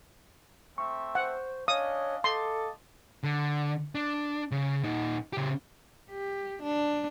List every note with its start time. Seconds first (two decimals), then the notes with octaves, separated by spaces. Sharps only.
0.78 A3 C4 E5 C#6
1.15 C5 F#5
1.68 C#4 D4 C#5 D#5 F5 D#6
2.24 A4 D#5 A5 C6 D6
3.23 D3
3.95 D4
4.51 C#3
4.83 A#2 D#4
5.33 C#3 G4
6.10 G4
6.63 D4